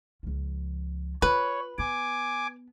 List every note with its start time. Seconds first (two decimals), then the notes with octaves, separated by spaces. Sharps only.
0.23 C#2 F3
1.22 F4 B4 C#5
1.78 B3 G#5 D6